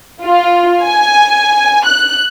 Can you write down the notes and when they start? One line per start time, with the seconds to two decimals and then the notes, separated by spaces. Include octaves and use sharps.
0.24 F4
0.83 G#5
1.86 F#6